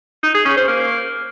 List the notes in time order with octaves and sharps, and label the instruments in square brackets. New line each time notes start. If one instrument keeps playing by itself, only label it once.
[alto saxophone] D#4
G#4
C#4
C5
A#3